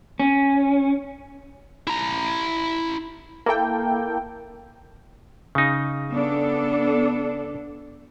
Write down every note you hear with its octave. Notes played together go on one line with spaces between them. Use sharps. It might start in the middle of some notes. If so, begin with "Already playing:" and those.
C#4
E4 A#5
A#3 E4 A4 G5
C#3 D#4
B3 D4 A4